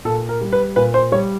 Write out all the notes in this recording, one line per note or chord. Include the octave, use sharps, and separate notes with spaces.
A#2 A4
A#4
G3
B4
A#2 B4
C5
G3 C#5